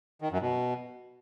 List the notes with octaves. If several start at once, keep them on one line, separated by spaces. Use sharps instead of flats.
D#3
F#2
B2